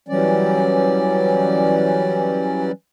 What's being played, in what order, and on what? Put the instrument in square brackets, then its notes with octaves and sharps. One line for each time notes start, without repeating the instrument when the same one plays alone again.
[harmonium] E3 F#3 G3 C#4 D5